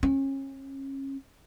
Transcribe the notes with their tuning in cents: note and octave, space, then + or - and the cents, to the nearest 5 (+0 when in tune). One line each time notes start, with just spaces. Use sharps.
C#4 -30